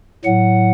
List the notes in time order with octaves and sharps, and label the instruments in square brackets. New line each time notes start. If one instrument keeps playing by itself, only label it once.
[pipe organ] A2 F#3 F#5